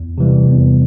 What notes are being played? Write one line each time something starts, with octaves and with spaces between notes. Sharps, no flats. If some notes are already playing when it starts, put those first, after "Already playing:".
Already playing: E2
C3 E3 G3
E2